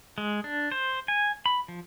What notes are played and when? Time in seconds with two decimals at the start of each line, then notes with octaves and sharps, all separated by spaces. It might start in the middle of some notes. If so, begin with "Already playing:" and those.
0.18 G#3
0.44 D4
0.72 C5
1.08 G#5
1.46 B5
1.68 F3